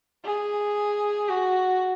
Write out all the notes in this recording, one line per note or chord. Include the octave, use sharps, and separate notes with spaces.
G#4
F#4